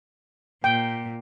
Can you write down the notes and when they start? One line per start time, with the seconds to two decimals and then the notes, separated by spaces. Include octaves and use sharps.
0.64 A#2 G5